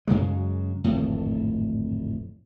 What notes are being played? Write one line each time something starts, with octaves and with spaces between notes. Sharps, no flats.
F#2 C#3 F#3 G#3
D1 G#1 F2 A2